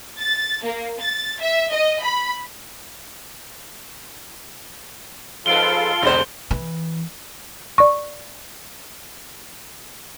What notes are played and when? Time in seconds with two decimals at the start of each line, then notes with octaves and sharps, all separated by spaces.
0.19 A6
0.64 A#3
1.00 A6
1.41 E5
1.72 D#5
2.03 B5
5.46 F2 G#2 F4 A4 B4 F5 D7 G7
6.02 F1 A#2 D3 G#3 C5
6.51 E3
7.78 D5 C#6